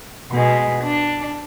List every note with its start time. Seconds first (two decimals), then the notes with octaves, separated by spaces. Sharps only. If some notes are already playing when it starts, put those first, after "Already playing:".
0.31 B2 G#3
0.83 D4